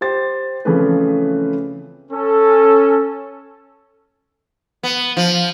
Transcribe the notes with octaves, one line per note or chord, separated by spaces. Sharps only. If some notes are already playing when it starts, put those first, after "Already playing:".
G4 C5 A6
C#3 E3 F3 A3 C4 B4
C#4 A4
B3
F3